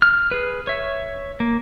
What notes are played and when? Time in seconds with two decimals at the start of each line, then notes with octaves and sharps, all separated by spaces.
0.02 F6
0.31 G#4 B4
0.67 C#5 E5
1.40 A#3